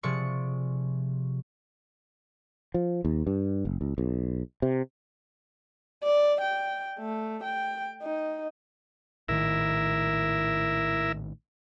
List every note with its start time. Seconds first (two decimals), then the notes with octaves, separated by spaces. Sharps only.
0.03 C3 F3 G#4 D5 C#6 C#7
2.74 F3
3.05 D#2
3.27 G2
3.65 F#1
3.81 C#2
3.98 B1
4.62 C3
6.03 D5
6.41 G5
6.99 A3
7.43 G5
8.03 D#4
9.29 A#1 A2 D#3 E4 A#4 E5